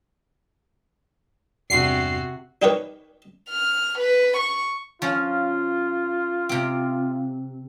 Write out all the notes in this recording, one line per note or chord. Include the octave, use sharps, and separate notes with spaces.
E2 G2 C3 F#4 C7
D4 D#4 G4 A#4 B4 C#5
F6
B4
C#6
F3 C#4 F4
C3 C4